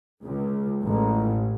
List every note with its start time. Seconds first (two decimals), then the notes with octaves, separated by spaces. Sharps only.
0.24 C#2
0.86 A1